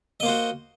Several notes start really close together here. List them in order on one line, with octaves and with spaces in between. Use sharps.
D#5 A#3 C5 F#4